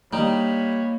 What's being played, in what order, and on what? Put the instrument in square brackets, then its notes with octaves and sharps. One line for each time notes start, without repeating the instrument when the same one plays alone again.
[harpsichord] G3 [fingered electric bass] A#3 [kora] D#4 [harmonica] C#5 B5